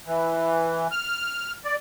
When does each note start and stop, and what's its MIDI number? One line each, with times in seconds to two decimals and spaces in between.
0.07 0.87 52
0.91 1.53 89
1.64 1.76 74